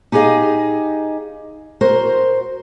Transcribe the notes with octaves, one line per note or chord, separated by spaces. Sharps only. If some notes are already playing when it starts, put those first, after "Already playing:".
D#4 G4 G#4 B4 D#5 F5
F#4 A#4 C5